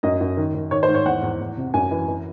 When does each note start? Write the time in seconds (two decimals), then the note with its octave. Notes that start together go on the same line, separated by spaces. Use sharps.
0.03 F#2 D#5
0.21 F#2
0.37 D#3
0.55 D#3
0.71 D#3 C#5
0.83 C5
0.88 G#2
0.95 C#5
1.06 E2 F#5
1.23 E2
1.40 E2
1.57 C3
1.74 F#2 G#5
1.91 E3
2.08 E3